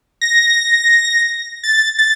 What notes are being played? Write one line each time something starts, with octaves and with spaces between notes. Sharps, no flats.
A#6
A6
A6